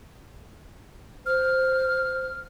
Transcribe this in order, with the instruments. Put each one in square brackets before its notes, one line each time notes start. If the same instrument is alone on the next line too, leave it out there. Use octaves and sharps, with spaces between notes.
[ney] C5 [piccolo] F6